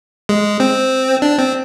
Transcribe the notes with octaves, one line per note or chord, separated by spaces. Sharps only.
G#3
C4
D4
C4